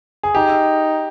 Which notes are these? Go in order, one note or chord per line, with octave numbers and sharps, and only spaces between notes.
G#4
D#4 G4